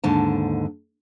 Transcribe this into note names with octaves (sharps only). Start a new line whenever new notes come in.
D#2 G#2 D3 A5